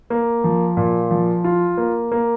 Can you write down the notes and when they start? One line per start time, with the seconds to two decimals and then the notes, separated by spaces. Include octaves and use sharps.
0.10 A#3
0.44 F3
0.77 A#2
1.11 F3
1.44 F4
1.77 A#3
2.12 A#3